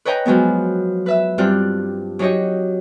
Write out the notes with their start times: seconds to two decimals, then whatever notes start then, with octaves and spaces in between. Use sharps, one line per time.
0.05 B4 C#5 D#5 G5 A#5 B5
0.26 F3 F#3 G#3 B3
1.06 B4 E5 E6
1.38 G2 G3 C4 D4 F4 F#6
2.19 F#3 D#4 G4 C#5 D#5